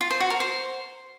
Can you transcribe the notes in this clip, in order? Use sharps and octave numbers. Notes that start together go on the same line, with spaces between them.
F4
C5
F#4
A#4
C5